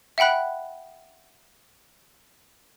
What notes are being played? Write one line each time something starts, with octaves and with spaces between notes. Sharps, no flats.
E5 F#5 G5 B5 F#6